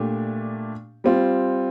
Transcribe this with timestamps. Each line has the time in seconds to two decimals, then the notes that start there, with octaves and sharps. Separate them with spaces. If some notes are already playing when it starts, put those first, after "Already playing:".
Already playing: A#2 A3 D4 G4
1.04 G3 C4 F4